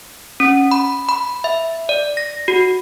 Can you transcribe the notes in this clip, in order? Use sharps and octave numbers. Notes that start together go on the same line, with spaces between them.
C#4
B5
B5
E5
D5
A#6
F#4